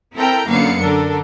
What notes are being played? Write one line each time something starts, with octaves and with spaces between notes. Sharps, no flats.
C4 E4 A4 A#4 G5 A#5
F#2 D3 A#3 B3 F5 C#7
D3 D4 A4 A#4